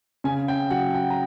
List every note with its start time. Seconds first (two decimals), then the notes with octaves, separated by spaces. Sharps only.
0.24 C#3 G#5
0.48 G5
0.70 F#3 F#5
0.94 G5
1.10 A#5